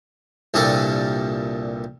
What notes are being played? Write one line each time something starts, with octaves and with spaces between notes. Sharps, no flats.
C2 G2 A#2 D4 A4